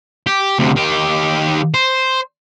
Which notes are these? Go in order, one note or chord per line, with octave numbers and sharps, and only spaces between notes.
G4
D2 C3
D#3 G4
C5